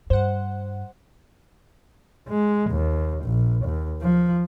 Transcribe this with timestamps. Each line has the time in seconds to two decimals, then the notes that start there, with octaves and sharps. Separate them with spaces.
0.10 G2 C5 F#5
2.28 G#3
2.71 D#2
3.25 A#1
3.65 D#2
4.02 F3